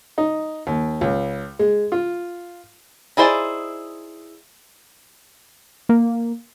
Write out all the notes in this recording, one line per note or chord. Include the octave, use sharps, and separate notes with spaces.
D#4
D#2
C#2
G#3
F4
D#4 E4 G#4 C5 D5
A#3